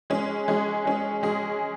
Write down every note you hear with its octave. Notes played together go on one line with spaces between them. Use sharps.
G#3 C#4 G#4
G#3 C#4 G#4
G#3 C#4 G#4
G#3 C#4 G#4